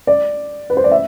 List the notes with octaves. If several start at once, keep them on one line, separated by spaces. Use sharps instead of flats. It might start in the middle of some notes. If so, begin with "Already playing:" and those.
D5
B4
C5
D5
E5